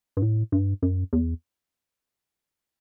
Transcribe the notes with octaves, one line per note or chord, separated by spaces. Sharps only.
G2
A2
G2
F#2
E2